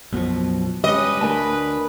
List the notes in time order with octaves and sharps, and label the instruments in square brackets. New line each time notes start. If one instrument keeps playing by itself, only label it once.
[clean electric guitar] B1 F#2 F3 [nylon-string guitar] B2
[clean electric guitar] G3 [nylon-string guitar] G#3 C#4 [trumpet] B4 [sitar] D#5
[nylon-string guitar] D2 [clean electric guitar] A#4 G#5 A5